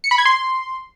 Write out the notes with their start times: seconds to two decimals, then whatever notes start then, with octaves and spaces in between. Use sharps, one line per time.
0.04 C#7
0.11 B5
0.18 G#6
0.25 C6